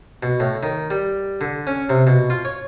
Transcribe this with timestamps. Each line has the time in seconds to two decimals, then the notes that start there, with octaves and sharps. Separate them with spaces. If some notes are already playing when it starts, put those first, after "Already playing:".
0.23 B2
0.40 A2
0.63 D#3
0.90 G3
1.41 D3
1.67 C#4
1.90 C3
2.07 B2
2.30 F4
2.45 C#5